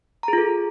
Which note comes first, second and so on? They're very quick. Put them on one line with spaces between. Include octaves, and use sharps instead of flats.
A#5 G#4 F4 A4